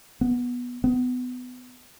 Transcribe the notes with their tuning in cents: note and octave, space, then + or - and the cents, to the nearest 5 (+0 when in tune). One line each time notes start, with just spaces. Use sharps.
B3 -10
B3 +25